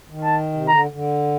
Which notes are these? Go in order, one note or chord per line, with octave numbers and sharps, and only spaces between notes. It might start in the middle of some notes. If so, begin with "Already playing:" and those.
D#3
A5
C3
D3 A#5
D3